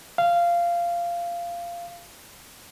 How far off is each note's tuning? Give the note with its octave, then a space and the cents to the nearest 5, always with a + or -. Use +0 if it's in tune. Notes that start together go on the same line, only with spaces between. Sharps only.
F5 -15